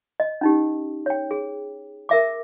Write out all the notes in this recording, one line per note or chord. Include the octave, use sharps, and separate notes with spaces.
D#5
C#4 D#4 G4
C#5 G5
G#4
A#4 E5 D6